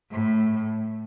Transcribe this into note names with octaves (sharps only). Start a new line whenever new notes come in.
A2